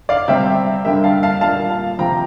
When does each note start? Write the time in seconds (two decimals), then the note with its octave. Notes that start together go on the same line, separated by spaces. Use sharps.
0.09 D5 F5
0.28 C3 G3 C4 E5 G5
0.85 G2 D3 G3 A#3 E5 G5
1.04 F5 A5
1.23 F5 A5
1.41 A#2 G3 A#3 F5 A5
1.70 F5 A5
1.98 C3 F3 C4 G5 A#5